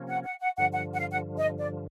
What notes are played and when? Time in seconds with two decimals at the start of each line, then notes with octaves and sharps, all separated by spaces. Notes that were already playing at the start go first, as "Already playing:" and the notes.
Already playing: C3 F3 A#3 C#4
0.09 F#5
0.25 F#5
0.40 F#5
0.57 G2 D3 F3 F#5
0.73 F#5
0.94 F#5
0.98 F5
1.11 F#5
1.39 D#5
1.59 D5